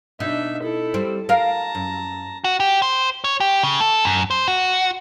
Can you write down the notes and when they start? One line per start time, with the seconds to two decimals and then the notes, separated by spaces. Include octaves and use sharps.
0.20 B2 D4 D#4 E5
0.63 E4 A4
0.94 G3 C4
1.29 A#4 F5 A5 A#5
1.75 F#2
2.44 F#4
2.60 G4
2.82 C5
3.24 C#5
3.40 G4
3.63 C#3
3.81 A4
4.05 F#2
4.31 C5
4.48 F#4